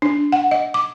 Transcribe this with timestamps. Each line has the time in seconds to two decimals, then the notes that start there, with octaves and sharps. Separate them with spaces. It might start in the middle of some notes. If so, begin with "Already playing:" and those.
0.02 D4
0.32 F#5
0.51 D#5
0.74 D6